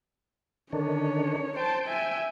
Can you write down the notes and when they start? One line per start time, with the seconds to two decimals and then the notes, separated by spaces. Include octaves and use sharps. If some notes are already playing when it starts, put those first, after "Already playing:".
0.73 D3 D#3 C#4 D4 C#5
1.57 C5 G5 A5
1.88 E5 G#5